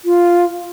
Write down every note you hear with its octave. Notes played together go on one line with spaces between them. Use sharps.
F4